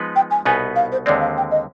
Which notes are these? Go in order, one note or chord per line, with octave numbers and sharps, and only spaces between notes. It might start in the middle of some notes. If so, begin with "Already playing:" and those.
Already playing: F3 G#3 B3 D#4 B4
G5
G#5
C2 B2 B3 D#4 B4 G#5
F5
C5
D#2 D3 G#3 C4 D5
F5
G5
D#5